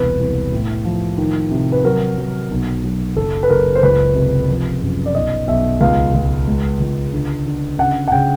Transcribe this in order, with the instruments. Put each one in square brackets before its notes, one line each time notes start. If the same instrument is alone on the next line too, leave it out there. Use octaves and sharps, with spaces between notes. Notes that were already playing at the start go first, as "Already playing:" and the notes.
Already playing: [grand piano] E1 C2 B4
C2
A2
F3
D#3
C3
B4
F#3 A#4
F#3
B1
F#3
F#1 A4
B4
F#1 A#4
C5
C#2 B4
C3
F3
F#2
D5
B1 D#5
B1 E5
C#2 F5
C#2
G#3
C#2
D3
D3
C#3 F#5
F#5
C#3 G5